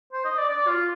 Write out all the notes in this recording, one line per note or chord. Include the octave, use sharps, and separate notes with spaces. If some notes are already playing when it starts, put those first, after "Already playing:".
C5
D#5
D5
D5
F4